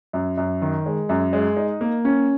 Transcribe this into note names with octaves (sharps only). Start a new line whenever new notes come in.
F#2
F#2
D#3
G#3
F#2
G#3
D#4
A#3
C#4